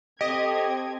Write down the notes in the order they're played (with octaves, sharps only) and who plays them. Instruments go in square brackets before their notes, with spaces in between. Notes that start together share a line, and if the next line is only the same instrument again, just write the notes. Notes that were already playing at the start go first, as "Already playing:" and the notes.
[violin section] C4 A4 G#6 [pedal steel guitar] G4 [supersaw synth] D#5